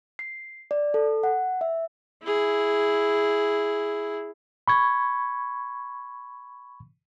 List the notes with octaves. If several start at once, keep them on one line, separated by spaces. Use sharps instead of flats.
C7
D5
A4
F#5
E5
E4 G#4
B5 C#6 G#6